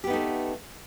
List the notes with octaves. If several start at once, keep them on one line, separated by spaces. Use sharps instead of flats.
A3 B3 D#4 G4